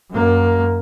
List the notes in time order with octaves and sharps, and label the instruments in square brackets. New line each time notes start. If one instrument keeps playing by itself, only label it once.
[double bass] F#2 A#3